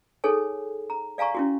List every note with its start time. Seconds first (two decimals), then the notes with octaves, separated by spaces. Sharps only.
0.24 D#4 G#4 A4 C#5 G#5
0.90 A#5
1.18 D5 F5 G#5 A#5 C#6
1.35 C#4 E4 F#4